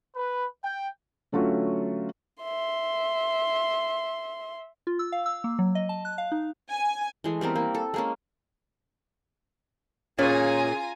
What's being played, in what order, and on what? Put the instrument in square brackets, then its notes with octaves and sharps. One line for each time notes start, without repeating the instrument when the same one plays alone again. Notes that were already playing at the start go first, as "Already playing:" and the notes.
[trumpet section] B4
G5
[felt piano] D3 F#3 A3 C#4 F4 F#4
[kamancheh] E5 C6
[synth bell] F4
E6
F5
E6
A#3
F#3
D#5
A5
F#6
F5
D#4
[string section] G#5
[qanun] E3 G#3 A3
G3 B3 C4 A#4
A#3
A4
G#3 A#3 C#4
[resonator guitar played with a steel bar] A#2 [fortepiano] C#4 C#5 [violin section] F4 G#5 A#5 [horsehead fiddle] G#4